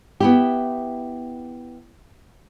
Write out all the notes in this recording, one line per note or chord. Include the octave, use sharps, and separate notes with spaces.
B3 E4 G4